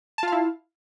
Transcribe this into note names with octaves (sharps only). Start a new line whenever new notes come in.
E4 F4 F5 A5